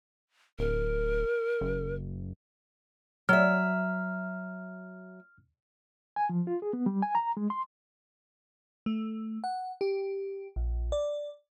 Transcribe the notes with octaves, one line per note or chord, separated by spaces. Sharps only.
D1 A#4
F#1
F#3 E5 F6
G#5
F3
F4
G#4
B3
G3
G#5
A#5
G#3
C6
A3
F#5
G4
A#1
D5